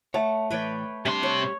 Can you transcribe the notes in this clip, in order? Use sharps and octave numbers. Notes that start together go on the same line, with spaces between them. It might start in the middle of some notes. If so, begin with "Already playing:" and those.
A3 C#5 F#5 A5
A2 E3 B4 C#5 D5 G5
C3 G3 D4 C6
C#5